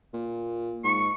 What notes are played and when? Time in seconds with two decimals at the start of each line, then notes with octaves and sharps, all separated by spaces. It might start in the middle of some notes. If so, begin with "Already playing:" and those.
0.14 A#2
0.84 G#2 C#6